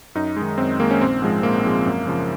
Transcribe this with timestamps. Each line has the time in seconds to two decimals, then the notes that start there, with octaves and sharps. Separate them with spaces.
0.15 F#2 D#4
0.37 D#3 G#3
0.58 F#2 C4
0.80 D#3 G#3 A#3
0.91 C#4
1.01 A#1 C4
1.22 G#2 F3 G#3
1.43 A#1 A#3
1.64 G#2 F3 G#3
1.86 F#2
2.07 C#3 F3